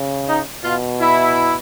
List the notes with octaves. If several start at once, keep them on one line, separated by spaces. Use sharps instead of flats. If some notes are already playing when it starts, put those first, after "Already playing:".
Already playing: C#3
D#4
B2 F4
E4